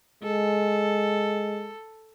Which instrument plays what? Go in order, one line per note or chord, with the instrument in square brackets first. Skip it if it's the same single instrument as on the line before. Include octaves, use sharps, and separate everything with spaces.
[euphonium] G#3 [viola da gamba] A4